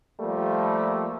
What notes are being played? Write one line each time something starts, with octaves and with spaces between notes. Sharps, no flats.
F3 G3 A3 A#3